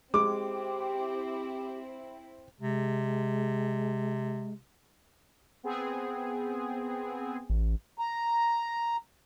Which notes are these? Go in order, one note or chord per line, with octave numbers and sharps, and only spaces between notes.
G#3 C4 E4 G4 D6
C3 G#3
B3 C4 G#4
A1
A#5